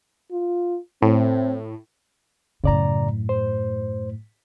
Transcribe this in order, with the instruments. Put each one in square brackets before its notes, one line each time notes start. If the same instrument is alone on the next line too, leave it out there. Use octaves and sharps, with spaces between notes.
[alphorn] F4
[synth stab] A2 [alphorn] C4
[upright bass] F#2 A2 [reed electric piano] C#3 D5 A#5
[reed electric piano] C5